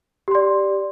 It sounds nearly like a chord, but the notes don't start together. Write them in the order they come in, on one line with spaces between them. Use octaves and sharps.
G4 C6 D5